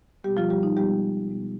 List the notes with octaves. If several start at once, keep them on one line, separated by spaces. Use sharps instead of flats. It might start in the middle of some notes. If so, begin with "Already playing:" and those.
B2 G3 G#3 B3 G4
F3 F4
G3 G4
D#4
B2 G3 G#3 B3 G4
B2 G#3 B3